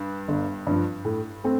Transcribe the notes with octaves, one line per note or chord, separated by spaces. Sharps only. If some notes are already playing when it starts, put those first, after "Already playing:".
Already playing: G2
G1
G2 F3
A2
A3 C4